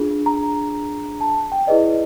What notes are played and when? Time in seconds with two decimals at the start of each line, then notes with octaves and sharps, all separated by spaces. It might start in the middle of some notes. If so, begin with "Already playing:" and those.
Already playing: D4 F4 G#4
0.26 A#5
1.21 A5
1.52 G5
1.67 E4 G#4 B4 D5 D#5